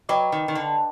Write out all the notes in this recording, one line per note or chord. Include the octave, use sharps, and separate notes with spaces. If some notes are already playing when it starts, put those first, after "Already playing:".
F#3 B4 D#5 G5 B5 D6
D#3
D#3
D3